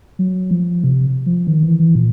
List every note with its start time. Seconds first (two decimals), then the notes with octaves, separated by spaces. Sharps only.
0.19 F#3
0.51 F3
0.84 C3
1.26 F3
1.47 D#3
1.63 E3
1.79 E3
1.95 A#2